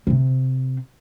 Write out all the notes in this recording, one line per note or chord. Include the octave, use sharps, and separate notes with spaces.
C3 C4